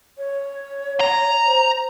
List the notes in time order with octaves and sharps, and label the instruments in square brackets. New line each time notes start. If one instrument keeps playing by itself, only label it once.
[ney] C#5
[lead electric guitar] A#5
[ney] C5